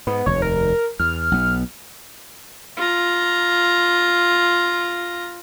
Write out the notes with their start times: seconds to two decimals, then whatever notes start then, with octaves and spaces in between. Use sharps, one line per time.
0.07 G#2 B3
0.26 F1 D#2 C#5
0.42 A#4
1.00 E2 F6
1.32 B1 B3
2.77 F4 A#5